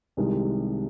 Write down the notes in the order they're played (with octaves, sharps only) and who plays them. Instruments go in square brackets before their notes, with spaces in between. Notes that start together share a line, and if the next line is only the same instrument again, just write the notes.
[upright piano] C2 C3 D#3 G#3